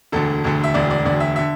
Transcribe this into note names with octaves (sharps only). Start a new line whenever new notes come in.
E1 D2 D3 A4
E1 D2 D3
E5
E1 D2 D3 D5
D5
E1 D2 D3 D5
E5
D3 E5